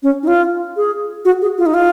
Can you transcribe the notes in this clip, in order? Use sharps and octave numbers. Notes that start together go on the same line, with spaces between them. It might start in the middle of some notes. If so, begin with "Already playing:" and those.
C#4
D#4
F4
G#4
F#4
G#4
F4
D#4
F4